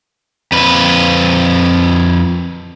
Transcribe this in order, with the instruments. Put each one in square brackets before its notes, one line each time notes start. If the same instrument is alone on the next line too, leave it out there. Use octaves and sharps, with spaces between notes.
[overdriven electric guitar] F2 B4